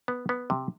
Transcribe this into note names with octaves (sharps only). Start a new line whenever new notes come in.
B3
B3
C3